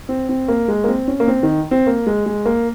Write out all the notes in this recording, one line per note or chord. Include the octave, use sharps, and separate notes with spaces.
C4
C4
A#3
G#3
A#3
C4
C#4
A#3
C4
D#3
C4
A#3
G#3
G#3
A#3